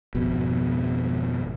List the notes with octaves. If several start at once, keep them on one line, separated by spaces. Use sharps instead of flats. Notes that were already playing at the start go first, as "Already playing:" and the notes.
G#1 F2 B2